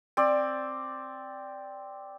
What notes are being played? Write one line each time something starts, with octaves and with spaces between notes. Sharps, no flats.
C4 D5